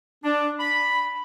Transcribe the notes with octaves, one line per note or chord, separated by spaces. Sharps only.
D4
B5